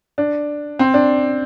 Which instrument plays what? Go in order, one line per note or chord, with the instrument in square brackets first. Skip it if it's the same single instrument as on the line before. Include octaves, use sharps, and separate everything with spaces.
[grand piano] D4
C4
D4